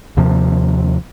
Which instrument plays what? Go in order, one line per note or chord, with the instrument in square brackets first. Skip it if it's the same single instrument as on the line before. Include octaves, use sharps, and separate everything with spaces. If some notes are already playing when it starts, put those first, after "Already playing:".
[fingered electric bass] D#2 C3 F3